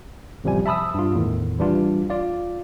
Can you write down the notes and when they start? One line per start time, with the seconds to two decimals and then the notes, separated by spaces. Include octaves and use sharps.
0.44 A1 C3 F3 G3 G#5
0.66 E5 A5 B5 D#6 E6
0.94 G2 F4
1.13 E2 A2 D#3
1.59 E3 G3 D4 F4
2.10 F4 D5 F5